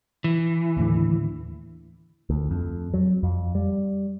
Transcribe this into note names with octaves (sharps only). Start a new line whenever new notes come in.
E3
D#2 A2 D3
D2
F2
F#3
F2
G3